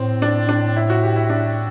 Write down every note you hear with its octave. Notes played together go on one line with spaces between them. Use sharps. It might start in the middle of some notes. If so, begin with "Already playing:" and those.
Already playing: A2 C4
D4
D4
E4
F#4
G4
E4
D4